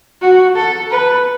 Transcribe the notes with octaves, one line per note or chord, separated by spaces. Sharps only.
F#4
A4
B4